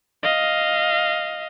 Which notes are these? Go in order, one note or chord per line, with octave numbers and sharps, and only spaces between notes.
D#5 F5